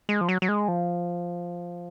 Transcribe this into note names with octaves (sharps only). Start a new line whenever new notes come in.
G#3
F3
F#3
F#3
G#3
F3